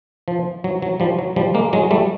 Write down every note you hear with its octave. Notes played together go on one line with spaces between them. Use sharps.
F3
F#3
F#3
F3 G3
F#3
F3 G3
G#3 A#3
F#3 G#3
G3 A3